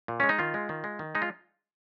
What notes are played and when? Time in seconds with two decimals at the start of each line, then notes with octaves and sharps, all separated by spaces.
0.08 A#2
0.20 G#3 C#4
0.29 D#4
0.39 D#3 F4
0.54 G#3
0.69 D#3
0.84 G#3
0.99 D#3
1.15 G#3 D#4
1.22 F4